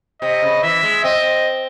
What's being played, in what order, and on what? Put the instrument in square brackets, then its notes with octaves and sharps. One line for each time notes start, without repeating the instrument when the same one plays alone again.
[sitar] C3 [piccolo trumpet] D#5
[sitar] C#3
[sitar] E3 [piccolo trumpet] E5
[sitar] G#3
[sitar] C4 [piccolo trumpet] D#5